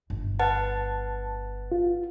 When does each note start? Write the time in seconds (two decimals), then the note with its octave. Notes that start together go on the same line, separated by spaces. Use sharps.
0.10 G1
0.39 B4 F#5 A5 A6
1.72 F4